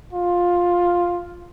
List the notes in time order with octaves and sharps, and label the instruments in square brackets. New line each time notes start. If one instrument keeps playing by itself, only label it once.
[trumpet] F4